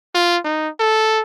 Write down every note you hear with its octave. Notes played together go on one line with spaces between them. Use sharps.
F4
D#4
A4